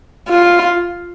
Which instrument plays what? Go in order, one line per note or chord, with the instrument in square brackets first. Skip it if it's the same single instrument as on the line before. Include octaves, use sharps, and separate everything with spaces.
[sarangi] F4